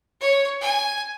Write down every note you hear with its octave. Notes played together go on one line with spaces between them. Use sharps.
C#5
G#5